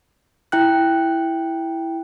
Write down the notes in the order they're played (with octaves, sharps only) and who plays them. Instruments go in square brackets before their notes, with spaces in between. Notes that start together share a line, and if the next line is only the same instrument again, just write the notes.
[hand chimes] E4 G5 F#6